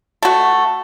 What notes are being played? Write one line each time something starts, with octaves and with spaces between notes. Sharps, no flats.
A3 F#4